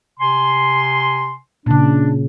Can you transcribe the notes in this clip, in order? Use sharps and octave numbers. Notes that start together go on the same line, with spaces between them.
C3 G#5 C6
A#2 C#3 D4